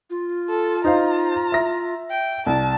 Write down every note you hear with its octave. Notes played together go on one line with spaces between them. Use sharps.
F4
A4
D#4 C5 F5 A#5
E5 A#6
G5
C2 A5